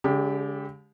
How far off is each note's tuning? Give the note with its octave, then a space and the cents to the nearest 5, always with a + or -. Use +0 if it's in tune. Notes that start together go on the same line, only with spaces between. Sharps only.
D3 -45 G#3 +0 G4 +0